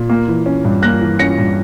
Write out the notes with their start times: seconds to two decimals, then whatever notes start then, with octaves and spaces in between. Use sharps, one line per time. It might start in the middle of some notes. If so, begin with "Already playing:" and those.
Already playing: A#2
0.09 A#3
0.28 E3
0.46 C#4
0.64 G2
0.83 A#3 F#6 A#6
1.01 E3
1.19 C#4 A#6 C#7
1.38 G2